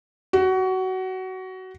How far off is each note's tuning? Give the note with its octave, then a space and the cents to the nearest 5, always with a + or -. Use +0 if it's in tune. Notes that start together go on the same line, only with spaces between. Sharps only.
F#4 +20